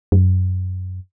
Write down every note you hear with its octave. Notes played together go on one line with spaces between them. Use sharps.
F#2